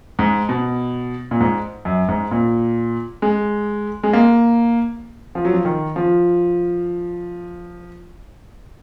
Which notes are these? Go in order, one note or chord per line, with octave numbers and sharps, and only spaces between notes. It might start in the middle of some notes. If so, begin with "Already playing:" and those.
G#2
B2
A#2
G#2
F#2
G#2
A#2
G#3
G#3
A#3
F3
F#3
F3
D#3
F3